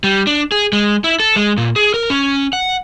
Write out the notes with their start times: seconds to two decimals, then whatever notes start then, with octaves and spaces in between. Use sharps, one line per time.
0.04 G3
0.27 D4
0.52 G#4
0.73 G#3
1.04 E4
1.20 A4
1.36 G#3
1.57 A#2
1.76 G#4
1.94 A#4
2.10 C#4
2.53 F#5